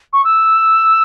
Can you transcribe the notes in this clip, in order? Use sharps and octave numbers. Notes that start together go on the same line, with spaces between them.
C#6
E6